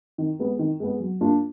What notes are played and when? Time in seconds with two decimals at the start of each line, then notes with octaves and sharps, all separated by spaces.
0.18 D#3
0.39 G#3 B3
0.59 D#3
0.80 G#3 B3
1.00 F#3
1.20 A#3 D4 F4